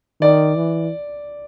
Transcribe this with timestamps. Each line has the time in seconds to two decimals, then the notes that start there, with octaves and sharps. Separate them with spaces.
0.21 D#3 D5
0.56 E3